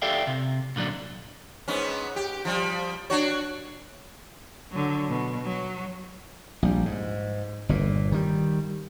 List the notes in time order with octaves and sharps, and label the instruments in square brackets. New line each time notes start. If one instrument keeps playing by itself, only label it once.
[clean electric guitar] G4 A4 D5 E5 F5 G5
C3
A#2 D3 F#3 D4
[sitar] G#2 B3 C#4
G4
F3 G3
D4 F#4 C#5
[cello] D3 F#3
B2
F#3
[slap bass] A#1 G3
G#2
G1 A#2
D#3 G3